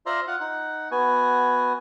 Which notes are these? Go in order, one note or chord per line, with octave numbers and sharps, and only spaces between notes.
F4 C5 D5 E5 A#5 C6
F4 F#5
D#4 F#5
B3 F#4 G#5